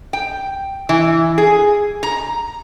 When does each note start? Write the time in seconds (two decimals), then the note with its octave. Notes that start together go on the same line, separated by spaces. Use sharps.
0.13 G5
0.89 E3
1.38 G#4
2.03 A#5